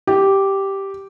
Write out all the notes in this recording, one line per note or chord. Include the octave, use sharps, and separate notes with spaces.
G4